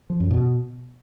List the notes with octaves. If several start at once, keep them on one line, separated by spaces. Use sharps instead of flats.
F3
F#2
B2